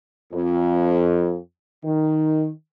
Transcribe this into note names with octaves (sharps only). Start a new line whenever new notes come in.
F2
D#3